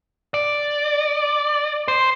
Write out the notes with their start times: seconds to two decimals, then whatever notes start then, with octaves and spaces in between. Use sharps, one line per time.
0.34 D5
1.88 C5